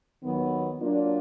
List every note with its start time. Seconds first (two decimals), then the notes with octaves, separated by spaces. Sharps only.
0.23 D#2 D#3 F#3 B3
0.79 F#3 A#3 D4 F4